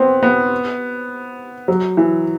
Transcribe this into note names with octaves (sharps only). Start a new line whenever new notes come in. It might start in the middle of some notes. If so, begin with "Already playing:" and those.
Already playing: B3 C4
B3
F#3
E3